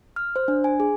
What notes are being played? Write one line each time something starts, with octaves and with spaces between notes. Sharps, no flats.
F6
C5
D4
G#5
G#4